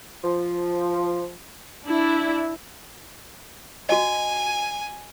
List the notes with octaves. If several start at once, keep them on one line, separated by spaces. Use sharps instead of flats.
F3
D4 E4
F#4 D#5 G#5